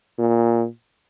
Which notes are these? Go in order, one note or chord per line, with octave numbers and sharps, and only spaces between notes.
A#2